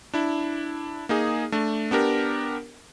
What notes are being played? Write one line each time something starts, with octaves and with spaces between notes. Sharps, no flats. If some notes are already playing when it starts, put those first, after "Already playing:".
D4 E4
A#3 D#4 G#4
A3 D4
B3 D4 G4 A#4